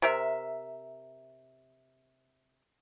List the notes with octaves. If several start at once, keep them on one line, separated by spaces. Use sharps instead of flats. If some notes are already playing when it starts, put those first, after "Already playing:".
C3 A#4 E5